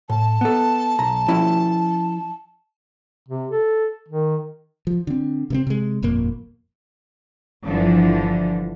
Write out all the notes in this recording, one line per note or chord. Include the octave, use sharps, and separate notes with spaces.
A2 A5
B3 A4
B1 A#5
F3 C#4 E4
C3
A4
D#3
F3
D3 C4
C3 A#3 C4
C3 G#3
G1 F2 A#2 A#3
G1 D3 E3 F3